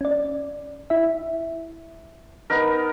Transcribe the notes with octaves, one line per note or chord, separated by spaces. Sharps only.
C#4 D5
E4 E5
B3 D#4 A#4